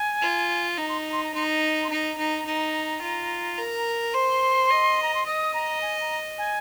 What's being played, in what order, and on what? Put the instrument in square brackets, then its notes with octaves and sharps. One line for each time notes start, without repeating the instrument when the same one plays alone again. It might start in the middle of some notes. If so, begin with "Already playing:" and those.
Already playing: [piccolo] G#5
[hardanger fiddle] F4
[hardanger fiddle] D#4 [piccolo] A#5
[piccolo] C6
A#5
C6
A#5
[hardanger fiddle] D#4 [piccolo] C6
[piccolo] A#5
C6
[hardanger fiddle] D#4 [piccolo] A#5
[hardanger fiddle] D#4
D#4
F4
A#4
[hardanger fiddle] C5 [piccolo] C6
[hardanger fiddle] D#5
[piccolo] A#5
C6
[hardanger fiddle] D#5 [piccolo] D#6
[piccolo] A#5
G#5
A#5
G#5